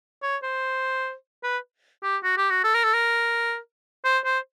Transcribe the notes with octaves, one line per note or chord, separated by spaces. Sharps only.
C#5
C5
B4
G4
F#4
G4
F#4
A4
A#4
A4
A#4
C5
C5